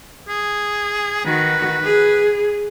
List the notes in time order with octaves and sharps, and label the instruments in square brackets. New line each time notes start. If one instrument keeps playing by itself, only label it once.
[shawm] G#4
[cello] D#3 F#4 [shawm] B4
[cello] G#4